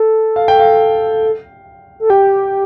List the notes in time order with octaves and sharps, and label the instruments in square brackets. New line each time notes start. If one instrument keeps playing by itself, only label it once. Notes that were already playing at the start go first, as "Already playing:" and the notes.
Already playing: [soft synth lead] A4
[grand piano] F5
G5
F5
[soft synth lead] A4
[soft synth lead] G4 [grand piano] G5